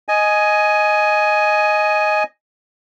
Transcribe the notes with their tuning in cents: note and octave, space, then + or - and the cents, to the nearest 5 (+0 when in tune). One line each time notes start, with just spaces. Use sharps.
D#5 +0 G#5 +10